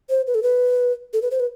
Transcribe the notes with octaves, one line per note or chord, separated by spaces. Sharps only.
C5
B4
A4
B4
A4
B4
C5
B4